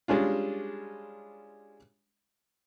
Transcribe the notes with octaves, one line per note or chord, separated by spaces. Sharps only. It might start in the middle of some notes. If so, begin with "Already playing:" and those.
G3 G#3 C#4 D4 F4